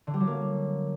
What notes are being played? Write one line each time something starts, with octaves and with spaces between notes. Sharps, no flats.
D3
G3
F#3
A#3